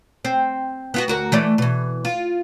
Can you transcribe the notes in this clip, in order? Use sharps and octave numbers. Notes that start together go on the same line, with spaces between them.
C4
B3 F4 F#4
D2 F#4 A#4
E3 A3 D5
B2 E3
F4